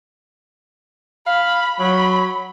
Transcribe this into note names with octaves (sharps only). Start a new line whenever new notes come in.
F5 B5
F#3 B5